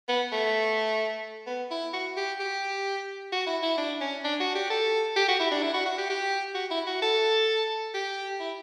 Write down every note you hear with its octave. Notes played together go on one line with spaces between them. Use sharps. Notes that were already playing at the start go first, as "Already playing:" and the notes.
B3
A3
B3
E4
F#4
G4
G4
F#4
E4
E4
D4
C#4
D4
F#4
G4
A4
G4
F#4
E4
D4
E4
F#4
F#4
G4
G4
F#4
E4
F#4
A4
G4
E4